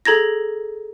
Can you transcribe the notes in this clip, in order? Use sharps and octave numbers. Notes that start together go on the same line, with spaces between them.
G#4 A4 A#5 G#6 A#6